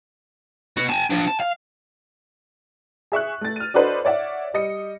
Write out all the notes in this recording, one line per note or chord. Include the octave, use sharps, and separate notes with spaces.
B2 F#4
G#5 A5
F3 D4
A5
F5
G#4 E5 C#6 F#6
A3 A6
F6 D#7
D4 F#4 A4 B4 C5 D#5
C#5 D5 E5 F#5
G3 D#5 C#7